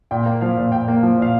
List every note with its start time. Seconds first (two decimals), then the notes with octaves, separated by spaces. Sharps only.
0.11 A#2 G5
0.26 A#3
0.41 F3 F5
0.57 A#2
0.72 A#2 G5
0.88 A#3
1.03 F3
1.18 A#2 F5